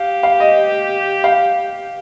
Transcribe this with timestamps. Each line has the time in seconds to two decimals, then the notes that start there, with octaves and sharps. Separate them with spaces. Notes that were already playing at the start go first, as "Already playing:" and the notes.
Already playing: G4 F5
0.23 F5
0.40 D#5
1.24 F5